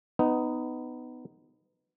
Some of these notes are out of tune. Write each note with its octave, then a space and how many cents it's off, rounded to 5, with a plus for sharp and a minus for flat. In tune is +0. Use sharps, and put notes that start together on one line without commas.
B3 +20 D#4 +0